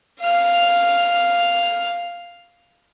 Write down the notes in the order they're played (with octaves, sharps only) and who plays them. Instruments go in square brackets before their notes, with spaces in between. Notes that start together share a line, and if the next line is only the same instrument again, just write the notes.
[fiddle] F5 F6